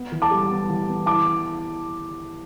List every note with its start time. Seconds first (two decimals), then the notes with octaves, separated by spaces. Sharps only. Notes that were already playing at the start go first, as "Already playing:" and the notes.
Already playing: B3
0.12 E3
0.22 A5 D6
0.31 G3
0.51 B3
0.70 E3
0.88 B3
1.06 E4 A5 D6